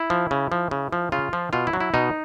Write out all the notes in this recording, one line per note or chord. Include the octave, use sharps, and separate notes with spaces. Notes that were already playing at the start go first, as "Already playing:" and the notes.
Already playing: E4
F3
C#3
F3
C#3
F3
C#3 F4
F3
B2 F4
E4
F#3
E4
B2 D#4